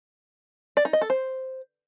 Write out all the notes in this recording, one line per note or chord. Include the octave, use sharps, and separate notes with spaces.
D5
D#4
D#5
A4
C5